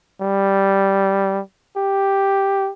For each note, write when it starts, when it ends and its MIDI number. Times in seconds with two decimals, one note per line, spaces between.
0.22 1.40 55
1.77 2.70 67